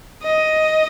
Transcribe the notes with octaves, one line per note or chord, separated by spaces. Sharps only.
D#5